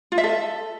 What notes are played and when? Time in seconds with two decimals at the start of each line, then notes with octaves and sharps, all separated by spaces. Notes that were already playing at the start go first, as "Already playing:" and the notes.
0.12 F4
0.18 E5
0.24 A4